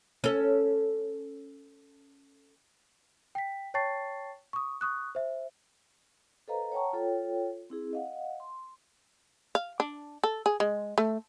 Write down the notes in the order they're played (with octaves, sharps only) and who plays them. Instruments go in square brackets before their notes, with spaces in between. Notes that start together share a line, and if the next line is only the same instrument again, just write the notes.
[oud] C#4 A4
[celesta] G5 B6
C#5 G5 A5 C#6 A6 C7
C#6 D#6
C#6 D#6 F#6
C5 E5
[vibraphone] A4 B4 C5 D#5 F5 A#5
C#5 F#5 G5 A5 A#5 C#6
F4 A4 C#5 G5
C4 E4 G#4
D#5 F5 F#5
C6
[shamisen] F5
D4
A4
G#4
G#3
A3